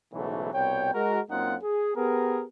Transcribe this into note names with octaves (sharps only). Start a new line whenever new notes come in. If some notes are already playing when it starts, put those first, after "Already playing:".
B1 G#2 C#3 E3 F#3 A3
C2 B2 C#5 G5
G#3 F#4 A#4
F#2 A#3 C4 D#4 F4 F#5
G#4
B3 G4 G#4 A#4